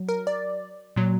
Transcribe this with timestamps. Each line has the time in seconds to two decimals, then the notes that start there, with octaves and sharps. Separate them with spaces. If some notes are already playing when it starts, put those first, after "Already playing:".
Already playing: F#3
0.08 A#4
0.27 D5
0.96 A#2 F#3